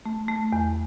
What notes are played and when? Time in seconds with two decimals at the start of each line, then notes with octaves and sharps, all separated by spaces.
0.06 A3
0.28 A3
0.52 E2